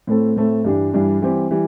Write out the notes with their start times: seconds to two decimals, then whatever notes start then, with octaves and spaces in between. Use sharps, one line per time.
0.07 A2 A3 C4 A4
0.36 A2 A3 C4 A4
0.64 G2 E3 G3 D4
0.93 G2 E3 G3 D4
1.22 E3 G3 C4 G4
1.51 E3 G3